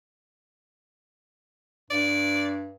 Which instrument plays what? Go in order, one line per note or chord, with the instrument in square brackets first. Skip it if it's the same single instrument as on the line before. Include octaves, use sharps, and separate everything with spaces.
[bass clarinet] G2 [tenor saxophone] D5